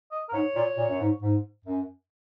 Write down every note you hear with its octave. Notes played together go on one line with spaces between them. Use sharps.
D#5
A#4
G#2 C#5
A#2
A#2
F#2
G#2
G#2
F#2